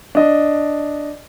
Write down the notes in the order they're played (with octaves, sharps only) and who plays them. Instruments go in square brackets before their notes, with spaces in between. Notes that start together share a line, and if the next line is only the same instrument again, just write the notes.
[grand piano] D4 D#5